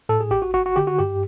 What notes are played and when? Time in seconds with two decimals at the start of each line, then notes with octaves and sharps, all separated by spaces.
0.09 A2 A4
0.20 G#4
0.31 A1 G4
0.42 F#4
0.54 G1 F#4
0.66 F#4
0.76 D3 G4
0.87 F#4
0.99 G2 G4